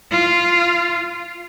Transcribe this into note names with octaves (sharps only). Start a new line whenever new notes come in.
F4